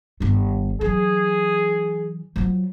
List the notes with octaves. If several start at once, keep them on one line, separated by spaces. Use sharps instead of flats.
G1 D#3
E3 F#3 G#4
F3 F#3